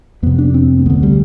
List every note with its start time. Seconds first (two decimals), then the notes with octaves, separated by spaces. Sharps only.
0.23 F2 C3 B3
0.38 D4
0.54 C4
0.79 A3
0.86 D2 D3 B3
1.03 G3